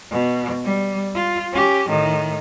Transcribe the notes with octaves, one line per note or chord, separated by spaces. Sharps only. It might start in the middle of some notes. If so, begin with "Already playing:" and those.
B2
G3
F4
C#4 G4
A2 D#3